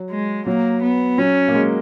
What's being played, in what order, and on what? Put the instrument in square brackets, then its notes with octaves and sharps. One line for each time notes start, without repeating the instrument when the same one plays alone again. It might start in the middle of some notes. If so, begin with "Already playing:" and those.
Already playing: [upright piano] F#3
[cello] G#3
[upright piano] F#3 [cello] A#3
[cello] B3
[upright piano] F#3 [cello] C#4
[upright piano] A#3
G#3